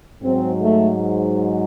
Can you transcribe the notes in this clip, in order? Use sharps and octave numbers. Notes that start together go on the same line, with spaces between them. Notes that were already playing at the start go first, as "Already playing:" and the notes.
G#2 F#3 C4
A3